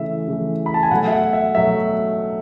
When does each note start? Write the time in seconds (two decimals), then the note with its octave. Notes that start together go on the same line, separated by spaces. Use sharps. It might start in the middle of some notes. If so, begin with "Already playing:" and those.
Already playing: C#3 E3 A3 E5
0.28 C#3 E3 A3
0.66 B5
0.74 A5
0.83 G#5
0.91 B2 F#3 A3 F#5
1.08 E5
1.12 F#5
1.33 E5
1.55 B2 F#3 A3 E5